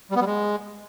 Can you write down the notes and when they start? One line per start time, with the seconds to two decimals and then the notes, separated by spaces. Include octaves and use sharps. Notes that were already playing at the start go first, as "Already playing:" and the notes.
0.11 G3
0.16 B3
0.21 G3
0.26 G#3